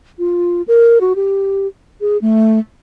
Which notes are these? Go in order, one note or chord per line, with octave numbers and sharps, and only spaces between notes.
F4
A#4
F#4
G4
G#4
A3